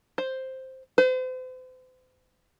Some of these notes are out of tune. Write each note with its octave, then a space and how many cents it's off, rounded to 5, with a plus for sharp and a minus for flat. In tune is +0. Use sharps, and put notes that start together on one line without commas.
C5 +0
C5 -40